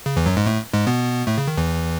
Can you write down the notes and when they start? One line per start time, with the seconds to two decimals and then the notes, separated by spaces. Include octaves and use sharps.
0.06 C#3
0.17 E2 E3
0.26 F#2 F#3
0.37 G#2 G#3
0.46 A2 A3
0.73 G#2 G#3
0.87 B2 B3
1.27 A2 A3
1.38 C#3
1.47 D#3
1.58 E2 E3